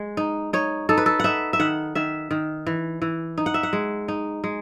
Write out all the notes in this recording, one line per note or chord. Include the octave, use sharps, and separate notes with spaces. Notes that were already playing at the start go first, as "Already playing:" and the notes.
Already playing: G#3
D#4
D#4 C#5
D#4 A4
B4
A4
D#4 E5 F#5
E5
D#3 F#5
D#3 E5
D#3
E3
E3
D#4
F#5
E5
F#5
G#3
D#4
G#3